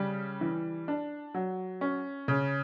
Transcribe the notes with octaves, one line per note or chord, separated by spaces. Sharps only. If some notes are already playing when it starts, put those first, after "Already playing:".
Already playing: C#3 G3
E3
D4
F#3
C#4
C#3